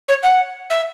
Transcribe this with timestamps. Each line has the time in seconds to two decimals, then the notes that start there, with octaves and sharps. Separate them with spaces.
0.08 C#5
0.23 F#5
0.70 E5